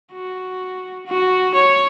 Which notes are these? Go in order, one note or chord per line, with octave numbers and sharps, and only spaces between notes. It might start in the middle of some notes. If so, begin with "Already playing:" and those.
F#4
F#4
C#5